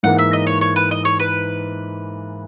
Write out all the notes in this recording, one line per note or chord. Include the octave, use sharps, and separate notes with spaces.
G#2 E3 A#3 F#5
E5
D#5
C#5
C#5
B4
D#5
C#5
B4